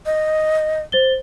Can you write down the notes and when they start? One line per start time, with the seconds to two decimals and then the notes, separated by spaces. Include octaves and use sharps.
0.06 D#5
0.92 C5 A6 G7